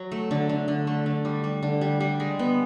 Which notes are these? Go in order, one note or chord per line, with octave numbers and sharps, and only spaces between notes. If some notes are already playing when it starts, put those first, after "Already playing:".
Already playing: F#3
A3
D3
D3
D3
A3
D3
G3
G3
D3
G3
G3
G#3
B3